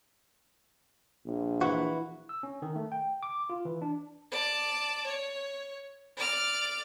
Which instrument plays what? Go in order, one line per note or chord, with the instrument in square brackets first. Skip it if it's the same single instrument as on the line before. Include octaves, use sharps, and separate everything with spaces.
[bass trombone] A#1
[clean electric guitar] E3 E4 F#4
[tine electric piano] E6
C#4
D#3
A3
G5
D6
F4
E3
D4
[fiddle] D5 A5
C#5
D5 F6